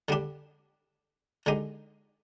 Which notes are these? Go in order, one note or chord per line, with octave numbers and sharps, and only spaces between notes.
D3 G3 D4 G4
D3 G#3 D#4 G4